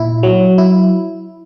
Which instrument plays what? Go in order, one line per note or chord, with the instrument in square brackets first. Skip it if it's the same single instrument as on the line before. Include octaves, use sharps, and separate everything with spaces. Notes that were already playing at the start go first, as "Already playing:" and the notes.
Already playing: [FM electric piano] A#2 E4
F#3
E4